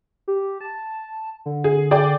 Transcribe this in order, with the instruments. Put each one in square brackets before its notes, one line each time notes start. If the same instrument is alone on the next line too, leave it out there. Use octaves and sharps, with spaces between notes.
[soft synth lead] G4
A5
D3
[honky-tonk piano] G#4
G#4 D5 G5